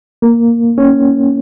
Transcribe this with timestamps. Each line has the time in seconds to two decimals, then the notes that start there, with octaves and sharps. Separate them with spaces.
0.22 A#3
0.78 C#4